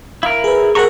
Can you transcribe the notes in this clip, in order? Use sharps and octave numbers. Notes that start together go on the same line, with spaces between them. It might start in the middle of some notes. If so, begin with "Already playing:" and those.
E4 A#4 F5
G#4 B4
G#4 A#4 F#5 A#5 C#6